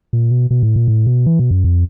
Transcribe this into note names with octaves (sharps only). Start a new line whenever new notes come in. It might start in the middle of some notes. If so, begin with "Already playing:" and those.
A#2
B2
B2
A2
A#2
A2
B2
E3
B2
F#2
F2